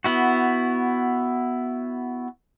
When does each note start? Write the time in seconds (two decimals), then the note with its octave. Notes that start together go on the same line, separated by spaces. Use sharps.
0.04 B3 E4 F#4